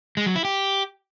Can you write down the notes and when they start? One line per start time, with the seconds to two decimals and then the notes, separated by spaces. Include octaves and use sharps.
0.17 G#3
0.26 F#3
0.35 E4
0.45 G4